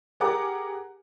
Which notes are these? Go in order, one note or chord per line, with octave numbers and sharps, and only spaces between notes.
G4 G#4 A#4 F#5 A#5 D6